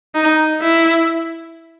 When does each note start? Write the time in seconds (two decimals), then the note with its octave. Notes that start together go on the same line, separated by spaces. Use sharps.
0.15 D#4
0.62 E4